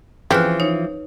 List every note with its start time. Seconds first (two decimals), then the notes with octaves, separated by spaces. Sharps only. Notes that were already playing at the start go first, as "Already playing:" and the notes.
0.31 C#3 E3 F3 C4 G4 B4 F6 F#6
0.60 D#4 C#5